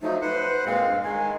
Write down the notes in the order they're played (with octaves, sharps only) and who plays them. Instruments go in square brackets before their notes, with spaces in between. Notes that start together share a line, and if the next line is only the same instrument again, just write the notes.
[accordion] F3 F#3 A3 [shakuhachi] D#4
[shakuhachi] B4 [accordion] C5 F#5
[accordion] A#2 G#3 C4 [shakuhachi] F5
[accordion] G2
[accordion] D#3 G#3 [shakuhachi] G#5